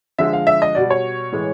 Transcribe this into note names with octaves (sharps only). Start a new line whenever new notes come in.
D3 F3 G#3 E5
F5
E5
D#5
B2 G3 D5
C#5
A2 E3 G#3